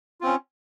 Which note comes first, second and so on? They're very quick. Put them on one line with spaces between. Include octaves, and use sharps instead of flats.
F4 C4 C#4